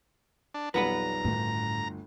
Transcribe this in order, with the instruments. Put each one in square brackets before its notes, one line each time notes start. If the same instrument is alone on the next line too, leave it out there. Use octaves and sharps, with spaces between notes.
[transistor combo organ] D4
[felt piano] B1 F2 G3 [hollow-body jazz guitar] B4 F#5 B5 [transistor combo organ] A#5
[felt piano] G1 D2 [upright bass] A2 D#3